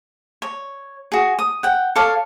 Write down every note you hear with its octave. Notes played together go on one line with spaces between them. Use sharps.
C#5
F#4 G#4
D#6
F#5 G5
A4 C#5 F5 D6